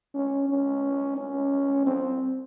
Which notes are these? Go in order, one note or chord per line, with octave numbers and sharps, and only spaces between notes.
C#4
C#4
C#4
C4